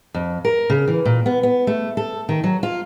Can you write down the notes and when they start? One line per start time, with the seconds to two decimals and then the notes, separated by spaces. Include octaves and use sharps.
0.14 F2
0.45 A#4
0.70 C#3
0.88 E3
1.05 A#2
1.26 B3
1.43 B3
1.67 A3
1.97 A4
2.29 D#3
2.44 F#3
2.63 F4